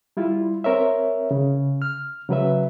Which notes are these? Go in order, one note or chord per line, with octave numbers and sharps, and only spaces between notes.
G3 E4 F4
C4 A#4 C#5 E5
C#3
F6
C#3 F#3 B4 E5